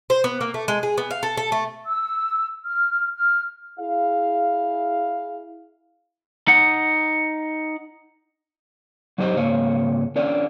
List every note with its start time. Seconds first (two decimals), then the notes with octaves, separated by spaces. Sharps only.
0.10 C5
0.24 B3
0.41 A#3
0.54 A3
0.68 G#3
0.83 G#4
0.98 B3
1.11 F5
1.23 A4
1.37 A4
1.52 A3
1.87 E6
2.64 F6
3.15 F6
3.79 E4 G#4 F5
6.48 D#4 F#5
9.18 F#3 D#4 G4 C5 D#5
9.37 G#2 C#3 A#3 C#5
10.16 C#4 D4 A#4 C#5 D5